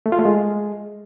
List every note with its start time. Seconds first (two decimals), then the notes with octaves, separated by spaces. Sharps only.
0.06 A3
0.12 F4
0.19 A3
0.25 G#3